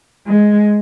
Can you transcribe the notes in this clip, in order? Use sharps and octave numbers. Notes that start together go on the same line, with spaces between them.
G#3